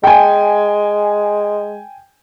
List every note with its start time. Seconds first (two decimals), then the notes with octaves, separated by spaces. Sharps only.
0.04 G#3 G5 G#5